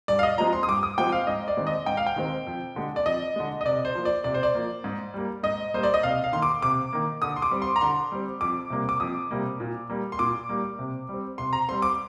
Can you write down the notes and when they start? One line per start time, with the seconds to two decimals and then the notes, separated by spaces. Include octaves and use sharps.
0.08 G2 D5
0.19 F5
0.23 D#5
0.38 F3 G#3 C4 A#5
0.53 C6
0.63 D#6
0.68 G2 D6
0.83 D#6
0.98 F3 G#3 C4 G5
1.12 F5
1.27 G#2 D#5
1.48 D5
1.57 D#3 G#3 C4
1.67 D#5
1.86 G#2 G5
1.97 F5
2.06 G5
2.16 D#3 G#3 C4
2.47 F2
2.76 D3 G#3
2.96 D5
3.06 F2 D#5
3.36 D3 G#3
3.61 D#5
3.65 C3 D5
3.85 C5
3.95 F3 A#3
4.05 D5
4.24 C3 D5
4.34 C5
4.43 D5
4.55 F3 A#3
4.84 G#2
5.14 G3 A#3
5.43 G#2 D#5
5.74 G3 A#3 C5
5.83 D5
5.94 D#5
6.03 C3 F5
6.24 F5
6.32 D#3 A#3 C6
6.42 D6
6.62 C3 D6
6.93 D#3 A#3
7.22 D3 D#6
7.36 C6
7.42 D6
7.51 G3 C4
7.62 C6
7.76 A#5
7.81 D3 C6
8.12 G3 C4
8.41 F2 D6
8.70 C3 G3 A#3
8.89 D6
9.00 F2 D#6
9.31 C3 G3 A#3
9.60 A#2
9.90 G3 A#3
10.12 C6
10.19 A#2 D6
10.49 G3 A#3
10.79 C3
11.09 G3 C4
11.38 C3 C6
11.53 A#5
11.69 G3 C4 C6
11.82 D6